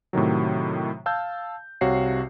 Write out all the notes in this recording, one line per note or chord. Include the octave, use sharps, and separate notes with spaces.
A2 C3 D#3 F#3
F5 A5 E6 G6
C2 C3 F#4 C#5 F5 C7